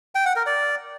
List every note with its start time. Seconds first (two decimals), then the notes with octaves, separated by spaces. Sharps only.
0.15 G5
0.25 F#5
0.36 A#4
0.46 D5